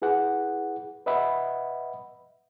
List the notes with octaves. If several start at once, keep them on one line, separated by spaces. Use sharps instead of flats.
E4 G#4 B4 F#5
B4 D#5 E5 F#5 B5